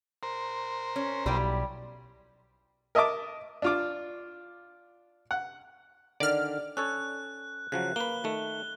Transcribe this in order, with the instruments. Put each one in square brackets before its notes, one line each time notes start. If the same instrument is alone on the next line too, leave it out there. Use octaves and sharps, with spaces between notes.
[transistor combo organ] A#4 C5
[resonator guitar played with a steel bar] C#4
[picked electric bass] B1 [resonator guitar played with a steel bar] G3 E4 G4
[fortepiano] A#4 D#5 E5 A5 D6
D4 F4 D6
F#5
[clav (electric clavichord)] D3 D#3 [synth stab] D5 F6
[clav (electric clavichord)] C#4 A4 C#5 [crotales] F#6
[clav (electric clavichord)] C#3 F3 F#3 [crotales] F#6
[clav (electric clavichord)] A#3 B4 [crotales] G7
[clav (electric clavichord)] D#3 A3